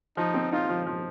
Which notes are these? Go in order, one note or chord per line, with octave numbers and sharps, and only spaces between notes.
F3 D#4
C4
D#4 F4
F3
F3